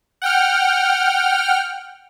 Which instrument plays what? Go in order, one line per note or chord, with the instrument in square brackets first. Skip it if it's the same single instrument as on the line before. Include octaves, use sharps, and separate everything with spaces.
[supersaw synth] F#5 G5 F6